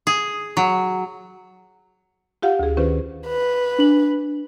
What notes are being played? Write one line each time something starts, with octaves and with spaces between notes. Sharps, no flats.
G#4
F#3
F4 G4 F5 F#5
D2 G#4
D#3 C#4 F4 B4 C5
B4
D4 F#7